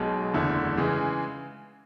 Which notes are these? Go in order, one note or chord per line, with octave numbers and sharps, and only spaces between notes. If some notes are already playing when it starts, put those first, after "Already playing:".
Already playing: B1 B2 G#3
F#1 E2 D3 A3 E4
C#3 E3 G#3